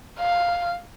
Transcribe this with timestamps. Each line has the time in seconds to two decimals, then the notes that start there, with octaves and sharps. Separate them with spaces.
0.19 F5